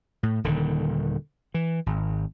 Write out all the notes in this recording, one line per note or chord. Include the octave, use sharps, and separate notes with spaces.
A2
D#1 D3 D#3
E3
G#1